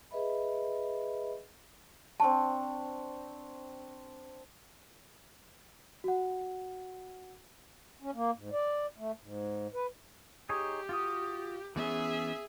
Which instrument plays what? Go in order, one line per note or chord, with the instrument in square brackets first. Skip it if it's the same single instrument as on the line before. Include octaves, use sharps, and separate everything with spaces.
[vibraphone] G#4 B4 D#5 E5 B5
[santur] C4 D4 C#6 [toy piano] A5
[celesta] F#4 F#5
[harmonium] C#4
A#3
G#2
D5
A3
G#2
B4
[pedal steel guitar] D#4 G#4 C#5 [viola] G4
[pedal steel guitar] F4 F#4 D#6
[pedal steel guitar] E3 B3 C#4 [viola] G#4 E5